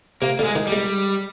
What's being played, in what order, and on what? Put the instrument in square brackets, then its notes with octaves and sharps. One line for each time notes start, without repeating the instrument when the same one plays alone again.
[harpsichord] C3 [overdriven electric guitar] A#3
[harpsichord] D3 [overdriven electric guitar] G#3 A#3
[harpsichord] D#3
[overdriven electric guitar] G3
[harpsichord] G#3